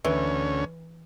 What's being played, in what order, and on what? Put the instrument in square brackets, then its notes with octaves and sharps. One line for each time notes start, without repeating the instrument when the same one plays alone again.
[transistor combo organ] D2 C#4 [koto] E3